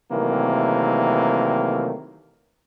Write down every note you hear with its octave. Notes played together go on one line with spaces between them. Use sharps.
C3 D#3 E3 F#3 A3 A#3